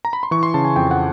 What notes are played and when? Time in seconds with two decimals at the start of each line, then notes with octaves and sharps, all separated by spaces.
0.05 A#5
0.13 B5
0.23 C6
0.31 E3 C#6
0.43 C6
0.54 C#3 A5
0.64 G#5
0.76 F2 G5
0.91 F#5